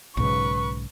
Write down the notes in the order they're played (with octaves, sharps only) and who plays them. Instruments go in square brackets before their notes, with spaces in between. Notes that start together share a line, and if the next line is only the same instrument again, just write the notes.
[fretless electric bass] B1 G#2 C#3 [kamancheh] B4 C#6